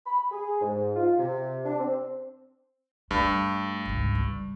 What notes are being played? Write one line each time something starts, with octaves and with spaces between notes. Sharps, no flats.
B5
G#4
G#2
F4
C3
D4
C4
G2 A3
G#1 C#2
G3